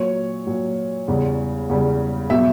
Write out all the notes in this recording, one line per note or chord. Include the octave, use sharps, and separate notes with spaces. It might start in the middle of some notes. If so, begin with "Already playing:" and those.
Already playing: A#2 F#3 C#5
A#2 F#3
E2 C#3 G3
E2 C#3 G3
B2 F#3 E5